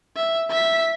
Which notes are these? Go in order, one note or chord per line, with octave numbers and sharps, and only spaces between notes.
E5
E5 B6